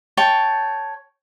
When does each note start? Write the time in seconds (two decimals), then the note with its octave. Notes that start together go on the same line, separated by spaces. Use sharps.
0.17 C#5 G5 A5